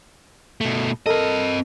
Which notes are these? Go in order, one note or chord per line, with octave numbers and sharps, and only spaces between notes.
B2 A3
C4 A4 A#4 D#5